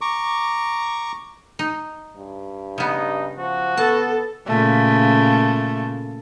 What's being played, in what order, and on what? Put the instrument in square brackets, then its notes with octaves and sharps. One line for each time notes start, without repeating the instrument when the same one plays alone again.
[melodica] A#5 C#6 D6
[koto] D#4
[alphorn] G2
[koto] C#3 B3 [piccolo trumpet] D#4
[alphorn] F3 [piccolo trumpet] F#4
[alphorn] B3 [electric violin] A4 [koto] A5
[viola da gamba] A#2 C#3 [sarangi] A3